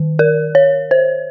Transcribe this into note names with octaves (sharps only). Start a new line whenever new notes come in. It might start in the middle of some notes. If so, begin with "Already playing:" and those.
Already playing: D#3
A#4
C#5
C5